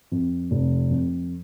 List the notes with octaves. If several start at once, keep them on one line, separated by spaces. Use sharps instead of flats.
F2
F1
F2